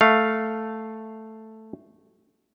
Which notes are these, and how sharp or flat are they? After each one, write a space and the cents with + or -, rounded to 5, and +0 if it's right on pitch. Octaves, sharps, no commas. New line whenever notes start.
A3 +0 F5 +0